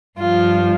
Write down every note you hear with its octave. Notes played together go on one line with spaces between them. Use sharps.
G2 F3 F4